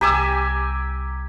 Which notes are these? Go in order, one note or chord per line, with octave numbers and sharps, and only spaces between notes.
C2 G4 G#5 A#5 D6 E6